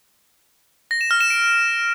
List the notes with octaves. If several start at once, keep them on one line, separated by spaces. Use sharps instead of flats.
A#6
E7
F6
E7
D7